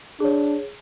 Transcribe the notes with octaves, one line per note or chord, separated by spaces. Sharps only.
D4 G#4 C#5